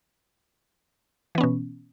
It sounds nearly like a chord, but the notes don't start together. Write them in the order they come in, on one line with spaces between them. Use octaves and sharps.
E3 B3 C#4 B2